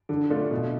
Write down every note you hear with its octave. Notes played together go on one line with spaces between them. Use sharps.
D3
A3 D4 F4
B2